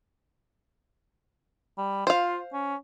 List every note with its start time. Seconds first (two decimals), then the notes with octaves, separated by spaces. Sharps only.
1.78 G3
2.07 F4 C5 F5
2.53 C#4